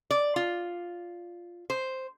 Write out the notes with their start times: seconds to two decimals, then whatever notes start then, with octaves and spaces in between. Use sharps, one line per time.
0.11 D5
0.36 F4
1.70 C5